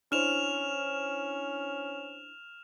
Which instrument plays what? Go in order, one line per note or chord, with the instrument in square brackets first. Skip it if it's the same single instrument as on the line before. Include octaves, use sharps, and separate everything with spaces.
[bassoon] C#4 [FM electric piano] D4 E4 C5 [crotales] F6 E7 F7